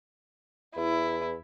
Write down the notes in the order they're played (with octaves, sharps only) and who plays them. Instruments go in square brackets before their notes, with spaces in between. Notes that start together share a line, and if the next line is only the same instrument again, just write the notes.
[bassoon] E2 [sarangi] E4